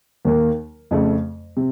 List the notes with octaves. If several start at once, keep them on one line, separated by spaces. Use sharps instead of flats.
D#2 D#3 A#3
F2 C#3 A3
C3